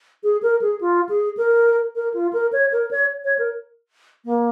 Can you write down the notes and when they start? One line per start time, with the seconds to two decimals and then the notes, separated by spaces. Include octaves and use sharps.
0.23 G#4
0.43 A#4
0.62 G#4
0.81 F4
1.09 G#4
1.37 A#4
1.96 A#4
2.14 F4
2.33 A#4
2.53 C#5
2.72 A#4
2.91 C#5
3.25 C#5
3.39 A#4
4.25 A#3